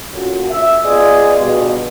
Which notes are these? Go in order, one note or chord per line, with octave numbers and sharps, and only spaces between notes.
A#2 D3 C#4 F4 F#4 A4
E5
B3 F4 G#4 D5 D#5
G2 B2